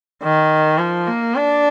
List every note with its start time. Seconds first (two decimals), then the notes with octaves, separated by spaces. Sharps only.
0.23 D#3
0.79 F3
1.07 A#3
1.35 D4